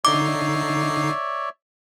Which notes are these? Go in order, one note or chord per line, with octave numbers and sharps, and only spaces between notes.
D3 D#4 C#5 D5 E5 D6 C7